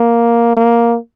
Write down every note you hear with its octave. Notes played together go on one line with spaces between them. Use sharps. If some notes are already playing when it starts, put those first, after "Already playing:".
Already playing: A#3
A#3